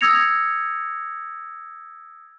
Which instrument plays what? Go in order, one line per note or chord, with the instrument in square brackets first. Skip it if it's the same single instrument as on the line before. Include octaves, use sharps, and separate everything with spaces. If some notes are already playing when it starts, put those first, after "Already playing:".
[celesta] D#6 E6 G#6 A#6 C#7 F7